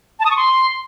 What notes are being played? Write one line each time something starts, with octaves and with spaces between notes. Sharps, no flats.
A5
D#6
C#6
C6